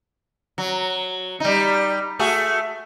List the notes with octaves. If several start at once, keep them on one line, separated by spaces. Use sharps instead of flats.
F#3
G3 D#4
A3 F#4 G#4